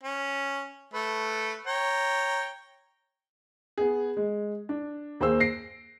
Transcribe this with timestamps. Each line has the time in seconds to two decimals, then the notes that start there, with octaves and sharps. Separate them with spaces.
0.03 C#4
0.94 A3 B4
1.67 C#5 G5 A#5
3.78 B3 G#4
4.17 G#3
4.69 D4
5.20 D#2 A#3 G#4 C5 E6
5.40 A#6 C7 D7